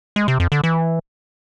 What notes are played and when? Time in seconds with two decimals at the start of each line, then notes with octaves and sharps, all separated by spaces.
0.16 G#3
0.28 C3
0.40 F2
0.52 D3
0.64 E3